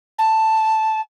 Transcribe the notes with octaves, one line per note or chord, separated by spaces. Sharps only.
A5